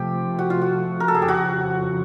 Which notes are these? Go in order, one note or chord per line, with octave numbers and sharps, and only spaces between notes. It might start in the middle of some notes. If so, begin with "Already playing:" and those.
Already playing: C3 F3 A3 G4
F#4
F4
F#4
A#4
A4
G#4
G4
F2 C#3 F3 F#4